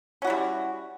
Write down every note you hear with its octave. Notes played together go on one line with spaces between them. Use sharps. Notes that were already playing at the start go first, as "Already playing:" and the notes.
G3 C#4 E4 F#4